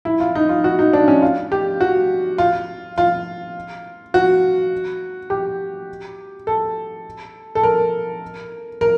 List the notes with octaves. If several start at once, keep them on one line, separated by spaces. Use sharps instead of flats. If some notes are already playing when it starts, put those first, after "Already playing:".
E4
F4
D#4
F4
F#4
D#4
D4
C#4
F4
G4
F#4
F4
F4
F#4
G4
A4
A4
A#4
A#4